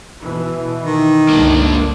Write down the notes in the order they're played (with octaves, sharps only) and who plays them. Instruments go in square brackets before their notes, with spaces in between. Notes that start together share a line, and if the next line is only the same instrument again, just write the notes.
[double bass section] B2 E3
[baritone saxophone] D#3
[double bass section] G1 C#2 [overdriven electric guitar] A#3 D4